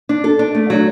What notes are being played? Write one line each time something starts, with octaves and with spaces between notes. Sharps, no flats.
D4
A4
D4
A3
F#3